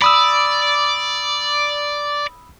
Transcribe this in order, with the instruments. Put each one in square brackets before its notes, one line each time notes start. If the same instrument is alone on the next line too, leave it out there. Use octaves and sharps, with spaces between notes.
[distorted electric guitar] D5 [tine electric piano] B5 D#6 E6